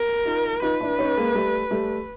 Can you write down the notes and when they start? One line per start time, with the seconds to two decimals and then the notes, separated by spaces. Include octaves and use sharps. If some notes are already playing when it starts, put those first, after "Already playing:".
Already playing: A#4
0.25 D#4 F4
0.62 D#4 F4 B4
0.81 D4 E4
0.99 C#4 D#4
1.17 G#3 A#3
1.35 G3 A3
1.71 G3 A3